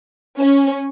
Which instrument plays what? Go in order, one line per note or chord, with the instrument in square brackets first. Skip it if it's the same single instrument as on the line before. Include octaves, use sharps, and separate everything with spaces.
[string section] C#4